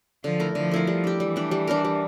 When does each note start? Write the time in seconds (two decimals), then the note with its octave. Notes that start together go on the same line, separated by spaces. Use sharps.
0.24 D3 F3
0.40 A3 E4 A#4
0.55 D3 F3
0.71 A3 E4 A#4
0.87 G3
1.04 D4 G4
1.20 E3 G3
1.36 D4 G4
1.51 G3
1.67 D4 G4 A#4
1.85 G3